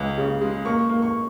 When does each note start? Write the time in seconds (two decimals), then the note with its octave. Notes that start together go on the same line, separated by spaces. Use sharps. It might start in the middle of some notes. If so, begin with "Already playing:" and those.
Already playing: C#2
0.17 C#3
0.41 G#3
0.65 A#3 C#6
0.89 A#3
1.02 C#6